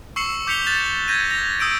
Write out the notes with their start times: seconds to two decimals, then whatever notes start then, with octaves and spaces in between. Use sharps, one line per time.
0.16 C#6 E6 C7 C#7 E7 F#7
0.47 D6 G6 B6 C#7 F7 G7
0.66 F#6 A6 E7
1.08 G6 G#6 A#6 D#7
1.31 A#6 F7
1.59 D#6 E6 G6 D7 D#7